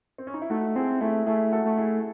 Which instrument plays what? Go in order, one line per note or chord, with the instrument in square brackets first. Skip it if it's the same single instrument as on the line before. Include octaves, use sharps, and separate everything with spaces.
[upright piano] C4
C#4
D#4
E4
[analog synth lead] A3 [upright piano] D#4 F#4
[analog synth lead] C4 [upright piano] E4 G#4
[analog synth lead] A3 [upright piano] E4 G#4
[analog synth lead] A3 [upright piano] E4 G#4
[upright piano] F#4 A4
[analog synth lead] A3
[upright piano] E4 G#4